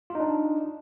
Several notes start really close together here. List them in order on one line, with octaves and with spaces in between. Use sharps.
F4 D#4 D4